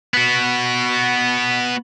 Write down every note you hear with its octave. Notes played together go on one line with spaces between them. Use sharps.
B3 F#4